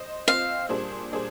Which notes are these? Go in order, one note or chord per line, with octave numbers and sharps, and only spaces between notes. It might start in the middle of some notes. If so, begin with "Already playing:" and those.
Already playing: C5 D#5
C4 F4 C5 D#5 F5
A#2 G3 D4 G#4 C5
A#2 G3 D4 G#4 C5